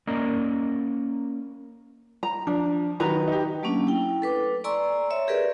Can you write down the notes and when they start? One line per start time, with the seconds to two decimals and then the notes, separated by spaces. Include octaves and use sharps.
0.07 A#3 C#4 A#4 D5 D#5 A#5
2.23 A#5
2.47 F3 D4
3.00 D#3 F#3 B4 D#5 A#5
3.28 D#4 G4
3.63 F#3 A3 A#3 C#4 D4
3.87 E4 G5
4.22 A4 B4 D6
4.64 D5 G#5 A#5 C6 C#6 E6
5.10 C#5 E5
5.28 G4 G#4 A#4 B4 D5 E5